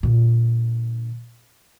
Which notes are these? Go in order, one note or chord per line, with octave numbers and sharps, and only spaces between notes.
A#2 D3